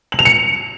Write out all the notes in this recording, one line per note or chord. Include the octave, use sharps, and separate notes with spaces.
F#7
F7
C#7